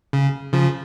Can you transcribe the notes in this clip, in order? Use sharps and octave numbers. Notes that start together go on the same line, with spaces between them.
C#3
C#3 F3